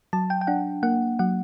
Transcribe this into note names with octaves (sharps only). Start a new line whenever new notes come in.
F#3 A5
G5
G5
D4 F#5
A#3 F#5
F#3 F#5